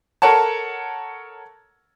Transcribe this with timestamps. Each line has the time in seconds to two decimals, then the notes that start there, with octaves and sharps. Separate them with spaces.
0.22 A4 A#4 C#5 F#5 A5